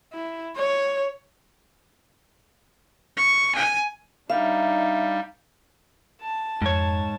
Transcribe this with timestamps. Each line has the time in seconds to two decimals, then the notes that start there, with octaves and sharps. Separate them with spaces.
0.13 E4
0.57 C#5
3.17 C#6
3.55 G#5
4.30 G3 D4 D#4 E5 F5
6.22 A5
6.62 F2 G#2 C#5